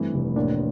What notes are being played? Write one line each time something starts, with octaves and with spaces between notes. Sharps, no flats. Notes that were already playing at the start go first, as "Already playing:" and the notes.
Already playing: G2 E3 A3 C4
F1
A1 A#3 D4